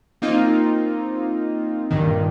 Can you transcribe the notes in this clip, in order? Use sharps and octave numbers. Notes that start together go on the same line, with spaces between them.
A#3 C4 D#4 F4
G2 A#2 D#3